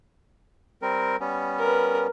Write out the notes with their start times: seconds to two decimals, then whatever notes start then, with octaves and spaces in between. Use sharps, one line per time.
0.82 G3 C4 A#4
1.20 G3 B3 C#4
1.58 A#4 B4